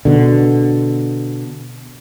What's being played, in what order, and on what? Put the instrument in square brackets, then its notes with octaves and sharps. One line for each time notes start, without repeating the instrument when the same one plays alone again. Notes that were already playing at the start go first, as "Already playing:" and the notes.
[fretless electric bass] B2 D3